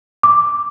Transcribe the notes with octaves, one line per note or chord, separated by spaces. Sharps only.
D6